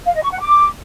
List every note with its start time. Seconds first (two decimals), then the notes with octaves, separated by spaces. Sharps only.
0.07 F5
0.15 D#5
0.23 C#6
0.32 F#5
0.40 D6